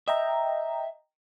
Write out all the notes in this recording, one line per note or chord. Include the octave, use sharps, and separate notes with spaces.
D#5 E5 G5 A#5